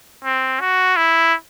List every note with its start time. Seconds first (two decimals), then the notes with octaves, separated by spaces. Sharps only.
0.24 C4
0.60 F#4
0.96 E4